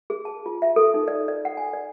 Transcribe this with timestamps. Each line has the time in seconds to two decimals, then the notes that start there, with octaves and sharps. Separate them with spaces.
0.10 G#4
0.25 A5
0.46 F4
0.62 E5
0.76 A4
0.94 D#4
1.08 D5
1.28 D5
1.45 F#5
1.57 G#5
1.73 D5